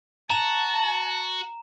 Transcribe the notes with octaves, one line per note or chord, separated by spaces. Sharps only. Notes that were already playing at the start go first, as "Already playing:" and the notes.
F#4 A5 A#5 E7